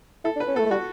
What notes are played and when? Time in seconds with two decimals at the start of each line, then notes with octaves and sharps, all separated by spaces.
0.24 E4 A4
0.36 D4
0.40 B4
0.48 C#4
0.56 A3 B3 A4
0.66 A3
0.71 G3 F#4